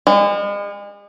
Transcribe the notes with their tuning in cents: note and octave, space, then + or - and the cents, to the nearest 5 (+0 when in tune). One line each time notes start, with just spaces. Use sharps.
G#3 -40